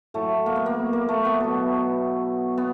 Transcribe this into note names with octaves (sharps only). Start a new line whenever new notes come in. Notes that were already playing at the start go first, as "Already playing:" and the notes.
A2 F#3 A3
A#3
B3
A#3
A#3
A3
B3
B2 F#3
B3